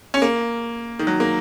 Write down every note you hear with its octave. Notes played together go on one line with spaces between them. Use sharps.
C#4
A#3
D#3
F#3
A#3